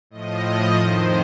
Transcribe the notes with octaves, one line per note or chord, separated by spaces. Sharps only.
A2 F3 D#5
F2 D#3 C5